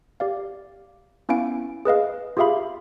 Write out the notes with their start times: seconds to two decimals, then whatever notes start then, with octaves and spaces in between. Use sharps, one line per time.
0.20 G4 D5 F5
1.29 B3 C#4 E4 F5 G#5 D7
1.85 G#4 B4 D#5 F5
2.37 F4 G4 G#4 E5 F5 B5